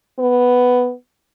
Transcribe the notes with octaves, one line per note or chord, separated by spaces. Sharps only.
B3